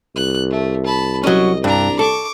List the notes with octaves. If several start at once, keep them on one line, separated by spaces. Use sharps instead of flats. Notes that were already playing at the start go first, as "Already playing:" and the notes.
C2 F#6
A3
A5 B5
F#3 C#4 D#5
G2 D4 A#5
A4 C#6 D6